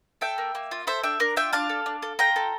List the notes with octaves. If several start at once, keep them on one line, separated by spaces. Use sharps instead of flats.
A4 E5 G5
A#3
A#3
F4
A4 C5 E5
D4 E5 G5
D4 A#4
F4 E5 G5
D4 F5 A5
A4
D4
A4
F4 G5 A#5
A4